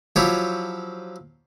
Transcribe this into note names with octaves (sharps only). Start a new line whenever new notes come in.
F3 F#3 E4 F4 G4 C#5